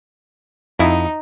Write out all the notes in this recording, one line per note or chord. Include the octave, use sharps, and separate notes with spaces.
F2 D#4 E4